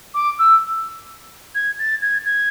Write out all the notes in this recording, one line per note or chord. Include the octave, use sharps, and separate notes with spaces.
D6
E6
G#6
A6
G#6
G#6